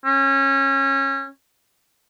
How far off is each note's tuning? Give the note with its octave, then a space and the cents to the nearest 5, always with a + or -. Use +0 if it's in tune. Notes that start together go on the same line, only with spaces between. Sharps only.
C#4 -25